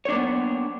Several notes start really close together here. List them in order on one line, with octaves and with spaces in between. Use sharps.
C#5 D4 A#3 B3